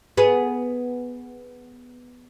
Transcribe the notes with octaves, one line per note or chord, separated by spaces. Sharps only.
B3 G#4